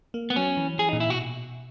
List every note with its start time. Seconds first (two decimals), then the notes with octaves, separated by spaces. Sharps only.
0.14 A#3
0.30 B3
0.36 F#3 C#4
0.57 E3
0.79 E3 G#4
0.89 D#4
0.93 A#2
1.00 E4
1.08 B2 F#4